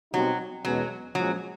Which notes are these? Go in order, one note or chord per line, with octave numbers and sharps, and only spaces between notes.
B2 F#3 G3 C4 D#4 F#4
E2 B2 F#3 G#3 C#4
A#2 F3 F#3 G#3 C#4 F4